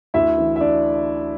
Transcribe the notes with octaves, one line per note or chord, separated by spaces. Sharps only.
D2 E4 E5
E3
E5
D4 D5